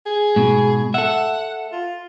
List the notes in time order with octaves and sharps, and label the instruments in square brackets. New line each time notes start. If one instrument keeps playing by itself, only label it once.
[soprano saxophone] G#4
[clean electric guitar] G#2 B2
[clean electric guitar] A4 E5 [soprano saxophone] F#5
[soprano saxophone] F4